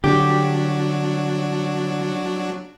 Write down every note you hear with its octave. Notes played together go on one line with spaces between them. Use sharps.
D3 F#3 D4 F#4 G4